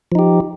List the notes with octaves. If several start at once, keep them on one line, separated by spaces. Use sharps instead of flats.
F3 D#4 G4